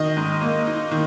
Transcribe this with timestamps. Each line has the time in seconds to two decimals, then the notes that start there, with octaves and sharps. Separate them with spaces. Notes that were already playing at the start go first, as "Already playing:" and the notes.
Already playing: D#3 D#5
0.17 G#2
0.41 A#3
0.67 D#4
0.91 D#3